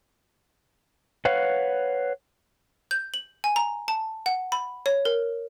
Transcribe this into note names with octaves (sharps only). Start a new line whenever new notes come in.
B4 C#5 F5 F#5
G6
F#7
G#5
A#5
A5
F#5
B5
C#5
A#4